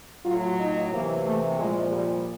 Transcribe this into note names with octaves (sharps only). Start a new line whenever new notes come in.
A2 F#3 F4
D#4
C3 E3 A#3
A3
A#2 F3 G#3
G3